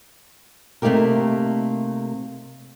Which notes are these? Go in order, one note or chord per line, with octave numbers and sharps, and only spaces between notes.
C3 A3 A#3 D#4 G4 A#4